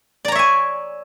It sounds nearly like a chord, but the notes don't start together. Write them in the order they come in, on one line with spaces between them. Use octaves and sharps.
D5 A#5 C#5 E5 G#5